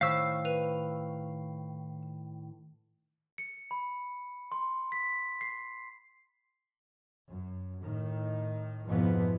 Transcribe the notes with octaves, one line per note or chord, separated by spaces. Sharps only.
A2 D#3 C5 C#5 F5 E6 B6
B4 D#7 F7
C#7
B5
C6
B6
C7
F#2
A2 D#3
F2 G#2 B2 E3 F3 B3